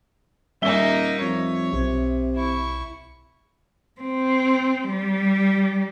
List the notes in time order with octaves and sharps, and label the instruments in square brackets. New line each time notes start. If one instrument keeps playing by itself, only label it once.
[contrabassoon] D#1 [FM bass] G3 [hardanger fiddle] A#3 D#4 [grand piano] E5 G7
[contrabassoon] F2 [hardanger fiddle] C#5
[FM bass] B1 [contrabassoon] C3
[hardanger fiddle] E4 C#6
[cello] C4
G3